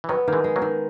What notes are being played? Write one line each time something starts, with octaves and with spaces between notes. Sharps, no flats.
E3
D#3 F#3 B3
D#3 A#3
E3 G#3
G#3
F#3 A#3
D#3